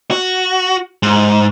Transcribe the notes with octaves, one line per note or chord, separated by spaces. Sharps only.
F#4
G#2